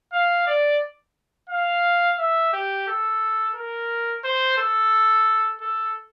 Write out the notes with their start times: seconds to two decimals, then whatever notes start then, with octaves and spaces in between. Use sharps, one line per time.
0.13 F5
0.47 D5
1.49 F5
2.18 E5
2.53 G4
2.88 A4
3.55 A#4
4.24 C5
4.58 A4
5.61 A4